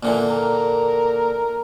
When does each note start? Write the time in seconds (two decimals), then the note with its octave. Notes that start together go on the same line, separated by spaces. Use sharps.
0.03 A#2 D3 E3
0.28 A#4